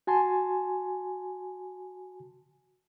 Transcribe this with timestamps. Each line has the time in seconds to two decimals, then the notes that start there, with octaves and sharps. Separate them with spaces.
0.07 F#4 G#5 A5 C6